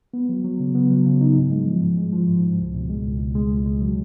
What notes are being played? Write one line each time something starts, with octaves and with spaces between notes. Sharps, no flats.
B3
F#3
F#3
C#3
B3
F#3
C#3
D#4
G#2
G#3
F3
G#2
G#3
F3
G#2
G#2
C#2
B2
G#3
C#2
C#2
G#3
C#2
G#3
F#3